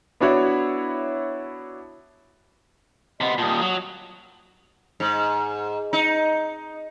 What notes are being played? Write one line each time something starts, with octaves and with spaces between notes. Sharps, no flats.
B3 D4 E4 F#4 C#5
C3 B3 D#5 C6
A#2 G3 A5 D#6
F#3
G#2
D#4